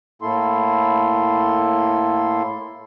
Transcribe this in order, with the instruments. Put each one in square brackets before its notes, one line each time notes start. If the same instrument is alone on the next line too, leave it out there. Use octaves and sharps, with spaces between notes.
[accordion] A2 A#3 E4 A4 C6